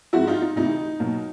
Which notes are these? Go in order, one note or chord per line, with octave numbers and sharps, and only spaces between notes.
G#2 F3 G#3 C4 E4 F#4
D#4 F4
D#4
D2 C3 E3 D#4
B2 F#3 A#3